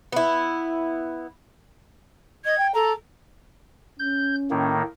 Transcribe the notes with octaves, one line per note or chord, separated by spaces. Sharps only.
B3 E4
D#5 G#6
G5
A4 A#5
C#4 G6
A2 D#3 A#3